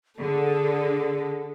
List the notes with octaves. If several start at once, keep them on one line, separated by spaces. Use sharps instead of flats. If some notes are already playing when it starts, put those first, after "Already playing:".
D3 G#4 A4